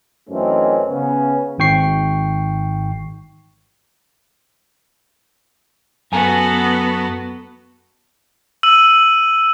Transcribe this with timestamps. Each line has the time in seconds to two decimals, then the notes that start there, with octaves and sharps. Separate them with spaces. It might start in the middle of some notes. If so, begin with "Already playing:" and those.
0.29 F#2 E3 A3 C4 C#4 D#4
0.89 C#3 B3 C#4
1.58 G#1 G#2 G5 C#6 C7
6.12 F#2 B3 F#4 A4 G#5 A#5
8.63 E6 D#7 F#7